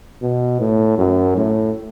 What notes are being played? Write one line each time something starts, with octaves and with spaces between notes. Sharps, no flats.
B2
A2
F#2
A2